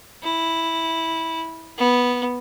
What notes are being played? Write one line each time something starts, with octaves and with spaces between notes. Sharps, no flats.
E4
B3